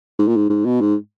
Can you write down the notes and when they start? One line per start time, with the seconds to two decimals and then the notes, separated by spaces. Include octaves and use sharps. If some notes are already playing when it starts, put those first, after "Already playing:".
0.19 G#2
0.28 A#2
0.36 G#2
0.50 G#2
0.66 B2
0.81 G#2